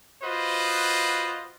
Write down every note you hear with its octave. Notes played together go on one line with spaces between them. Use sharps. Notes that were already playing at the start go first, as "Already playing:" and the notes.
F4 F#4 B4 C5 D#5